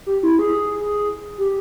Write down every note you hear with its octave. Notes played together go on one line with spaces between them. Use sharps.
G4
E4
G#4
G4